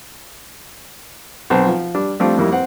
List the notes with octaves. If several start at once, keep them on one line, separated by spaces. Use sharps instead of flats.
B1 C4 A5
F3
G3 D4
F3 G3 A3 C4 D4 F4
F2 D#3 G3 A#3 E4
C4 F#5